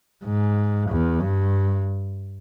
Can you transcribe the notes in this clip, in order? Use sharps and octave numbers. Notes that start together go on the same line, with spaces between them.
G#2
E2
G2